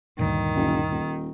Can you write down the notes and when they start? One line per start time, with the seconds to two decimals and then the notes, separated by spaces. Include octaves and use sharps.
0.19 D2 G2 A#2 D#3
0.55 F#1
0.90 D#1